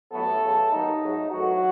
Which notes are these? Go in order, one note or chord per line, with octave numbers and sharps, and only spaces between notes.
A1 A2 F#3 A3 B3 A4
E2 C#3 F#3 A3
D#2 D#3 F#3 B3 D#4
G#2 F#3 A3
G#1 G#2 E3 F#3 A3 F#4